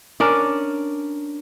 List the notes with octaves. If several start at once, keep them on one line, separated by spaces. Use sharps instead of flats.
C#4 D4 A#4